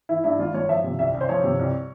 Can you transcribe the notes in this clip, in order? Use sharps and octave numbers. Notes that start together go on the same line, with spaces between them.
E3 E4
G2 E4
G#1 F4
G#1 C#5
F3 E5
C3
C2 E5
C2
C5
F3 C#5
C3
C2